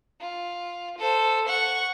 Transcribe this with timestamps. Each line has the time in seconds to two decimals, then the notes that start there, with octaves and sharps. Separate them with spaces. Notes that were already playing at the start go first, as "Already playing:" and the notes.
0.21 F4
0.98 A4 C5
1.47 F#5 C#6